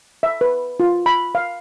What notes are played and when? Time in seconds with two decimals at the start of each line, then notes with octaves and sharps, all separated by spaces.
0.23 E5
0.41 B4
0.80 F4
1.06 B5
1.35 F5